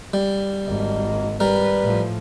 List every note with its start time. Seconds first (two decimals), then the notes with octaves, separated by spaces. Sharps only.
0.13 G3
0.68 G#1 A#3 F#4 D#5
1.40 G3 A#4 B4 D5
1.83 A2 F3